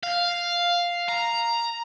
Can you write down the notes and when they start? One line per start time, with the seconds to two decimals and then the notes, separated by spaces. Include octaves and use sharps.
0.03 F5
1.09 A#5